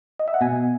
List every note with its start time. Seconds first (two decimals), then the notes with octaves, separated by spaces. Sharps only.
0.19 D#5
0.28 E5
0.34 F#5
0.41 B2 G#5